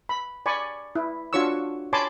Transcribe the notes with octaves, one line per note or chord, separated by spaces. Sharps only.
B5
D5 G#5 B5 C#6
E4
D4 F4 F#4 C#5 C#6 E6
C#5 G#5 A5 B5 C6 D6